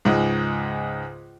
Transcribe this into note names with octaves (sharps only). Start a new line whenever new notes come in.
C#2 G#2